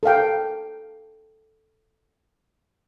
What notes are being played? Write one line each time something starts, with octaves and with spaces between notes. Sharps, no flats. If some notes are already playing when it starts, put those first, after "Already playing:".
A4 A#4 F5 G5